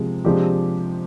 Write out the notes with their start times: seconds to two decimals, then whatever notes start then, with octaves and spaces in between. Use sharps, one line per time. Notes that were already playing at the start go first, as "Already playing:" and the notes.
Already playing: C3 F3 G#3
0.25 C3 F3 G#3 D4 G4